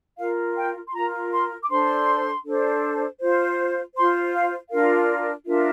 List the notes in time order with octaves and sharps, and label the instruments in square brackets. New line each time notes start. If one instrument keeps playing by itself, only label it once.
[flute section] F4 A#4 F5
G5
C6
F4 A#4 A#5
C6
D6
D4 A4 C5 C6
D4 A4 C5
F4 C5
F4 C5 C6
F5
D4 F4 A#4 F5
D4 F4 A#4 E5